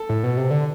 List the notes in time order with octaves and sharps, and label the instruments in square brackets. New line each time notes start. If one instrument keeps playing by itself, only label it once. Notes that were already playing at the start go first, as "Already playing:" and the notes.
Already playing: [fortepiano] A4
[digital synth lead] A2
B2
C3
D3